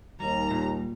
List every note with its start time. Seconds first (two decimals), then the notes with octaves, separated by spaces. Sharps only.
0.20 D#2 G3 A#5
0.51 A#2